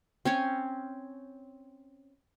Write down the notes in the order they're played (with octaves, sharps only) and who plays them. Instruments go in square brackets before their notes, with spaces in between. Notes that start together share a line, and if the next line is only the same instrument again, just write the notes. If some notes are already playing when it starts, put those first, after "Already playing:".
[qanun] C4 C#4 C#5